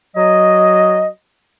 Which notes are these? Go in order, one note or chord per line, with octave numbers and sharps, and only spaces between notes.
F#3 D#5